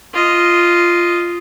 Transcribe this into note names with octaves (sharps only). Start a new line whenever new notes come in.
F4 D#5